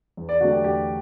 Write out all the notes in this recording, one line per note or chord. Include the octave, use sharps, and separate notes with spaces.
E2
D5
D3 F#3 A3 F#4
G4
E2 G4